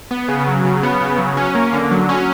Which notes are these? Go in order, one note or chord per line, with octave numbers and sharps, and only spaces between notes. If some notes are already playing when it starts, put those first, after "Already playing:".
B3
C#3
F#3
C#3
B3
C#3
F#3
C#4
A#3
D3
F#3
C#4